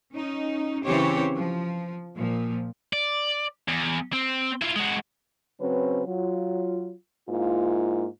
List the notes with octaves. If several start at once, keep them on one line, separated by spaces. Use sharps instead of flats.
C#4 D#4
C#3 E3 C4 G4 C5 C#5
F3
A#2 F3
D5
E2
C4
E4 F4
G#3 F#4
C#3 F#3 C4 C#4 B4
F#3 F4
G#2 A#3 E4 F4